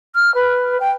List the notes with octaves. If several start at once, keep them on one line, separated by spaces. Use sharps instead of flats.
F6
B4
G5